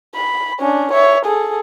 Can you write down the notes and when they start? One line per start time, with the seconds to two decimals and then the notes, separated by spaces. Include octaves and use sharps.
0.15 B5
0.60 C#4 D4
0.92 C#5 E5
1.25 G#4 A4